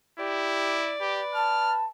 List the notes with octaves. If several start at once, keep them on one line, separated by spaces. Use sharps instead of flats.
E4 G4 D5
G4 B4
A5 F6